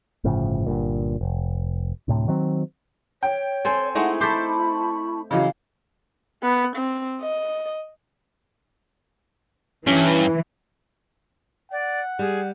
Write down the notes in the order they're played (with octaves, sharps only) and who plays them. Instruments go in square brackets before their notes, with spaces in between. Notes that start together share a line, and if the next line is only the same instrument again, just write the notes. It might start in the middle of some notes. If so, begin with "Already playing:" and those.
[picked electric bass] G1 A2 C#3 F3
G1 G2 A#2
F1
D2 A2 C3
D#3 F#3 C4
[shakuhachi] C#5 [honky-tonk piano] G5
[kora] C4 A4 C5 [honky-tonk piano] G#5
[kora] G#3 A3 D#4 [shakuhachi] E4 [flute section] F#5
[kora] A4 C5 [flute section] A5 B5 C#6 [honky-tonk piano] D6 G6 B6
[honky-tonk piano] C#3 E3 F#3 [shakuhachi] D#5 [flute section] F5
[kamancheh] B3
C4
D#5
[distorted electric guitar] G2 [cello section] E3 [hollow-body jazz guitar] C#4
[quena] D5 [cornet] F#5
[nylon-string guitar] G3 [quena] G#4